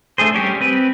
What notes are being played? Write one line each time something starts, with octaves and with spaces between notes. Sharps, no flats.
A3 D4 G#4 C5
G3 C#4 G4 C#5
C4 B4